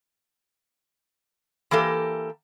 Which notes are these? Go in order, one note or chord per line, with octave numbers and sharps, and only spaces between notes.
E3 A#3 G4 A4